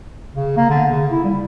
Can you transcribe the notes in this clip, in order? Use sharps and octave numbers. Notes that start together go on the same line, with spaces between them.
C#3
A#3
D3
C#3
E4
G3